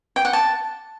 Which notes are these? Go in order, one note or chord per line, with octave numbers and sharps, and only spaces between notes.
G5
F#5
A5